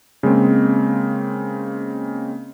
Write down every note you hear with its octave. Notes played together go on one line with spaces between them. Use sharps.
C#3 G#3 A#3 C4